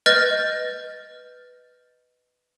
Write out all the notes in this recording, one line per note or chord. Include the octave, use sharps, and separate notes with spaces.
B4 D#5 F6 G6 A6